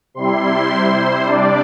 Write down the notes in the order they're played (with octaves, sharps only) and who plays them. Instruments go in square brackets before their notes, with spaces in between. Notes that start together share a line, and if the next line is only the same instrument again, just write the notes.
[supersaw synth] C3 G3 E4 C6
C5
C3 G3 D4 D5